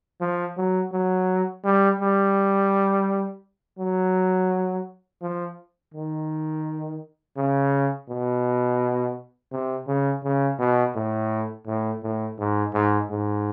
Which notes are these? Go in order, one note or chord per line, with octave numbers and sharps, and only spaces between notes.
F3
F#3
F#3
G3
G3
F#3
F3
D#3
C#3
B2
C3
C#3
C#3
B2
A2
A2
A2
G#2
G#2
G#2